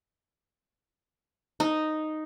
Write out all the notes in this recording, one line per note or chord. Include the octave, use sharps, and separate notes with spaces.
D#4